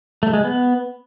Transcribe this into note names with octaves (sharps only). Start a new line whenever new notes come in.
A3
G#3
B3